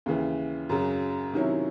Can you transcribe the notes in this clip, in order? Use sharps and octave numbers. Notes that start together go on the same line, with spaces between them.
D#2 C#3 E3
F#2 C#3 F#3
C3 D#3 F#3 C#4 E4